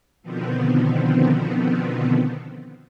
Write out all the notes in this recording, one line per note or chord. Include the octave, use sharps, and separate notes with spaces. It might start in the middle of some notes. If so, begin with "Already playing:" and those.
B2 D3 D#3 F3 B3 C4